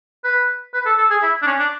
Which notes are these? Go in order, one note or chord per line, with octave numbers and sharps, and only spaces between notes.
B4
B4
A4
A4
G#4
E4
D4
C#4
D4